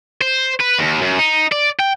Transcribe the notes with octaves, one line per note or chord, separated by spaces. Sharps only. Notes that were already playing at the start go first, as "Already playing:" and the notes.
C5
B4
D#2
F#2
D#4
D5
G5